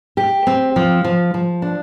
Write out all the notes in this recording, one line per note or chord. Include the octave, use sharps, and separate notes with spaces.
G4
C4
F3
F3
F3
D4